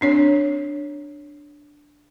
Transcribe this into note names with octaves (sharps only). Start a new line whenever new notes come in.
C4 D4 C#5